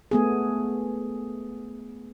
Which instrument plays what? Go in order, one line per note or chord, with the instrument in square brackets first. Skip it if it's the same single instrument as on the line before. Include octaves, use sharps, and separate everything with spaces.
[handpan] A3 B3 G#4